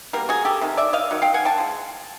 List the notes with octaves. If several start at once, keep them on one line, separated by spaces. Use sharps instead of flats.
B2 G3 A#3 A#4
F#4 G#4
G4 A4
C3 D#3
D5 E5
D#5 F5
D#3 F#3
F5 G5
F#5 G#5
G5 A5
F3 G#3